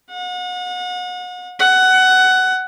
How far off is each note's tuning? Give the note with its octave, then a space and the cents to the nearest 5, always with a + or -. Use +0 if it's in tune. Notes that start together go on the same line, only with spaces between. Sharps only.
F#5 -40
F#5 +15